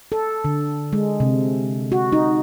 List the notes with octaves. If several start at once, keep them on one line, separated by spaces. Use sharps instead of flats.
A4
D3
G#3
C3
F#4
D#4